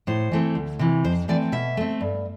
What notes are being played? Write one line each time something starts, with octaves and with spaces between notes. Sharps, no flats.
A2 C5
E3 A3 C4
D2
C3 E3
F2 C5
E3 A3 C4 D5
B2 E5
A3 C4
G2